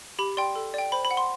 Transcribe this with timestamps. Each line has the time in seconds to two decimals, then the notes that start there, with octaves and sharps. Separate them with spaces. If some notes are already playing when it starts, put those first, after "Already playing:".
0.19 G4 B5
0.37 D5 G5 C6
0.56 A4
0.74 D5 G5
0.92 C5 B5
1.05 B5
1.11 F#5
1.17 C6